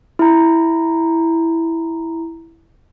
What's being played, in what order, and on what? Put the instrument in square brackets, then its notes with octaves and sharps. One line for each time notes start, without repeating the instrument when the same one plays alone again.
[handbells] E4 A#5